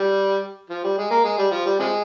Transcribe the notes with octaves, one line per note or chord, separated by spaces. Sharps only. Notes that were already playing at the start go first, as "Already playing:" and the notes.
Already playing: G3
F3
G3
G#3
A#3
G#3
G3
F3
G3
C3 F3 G#3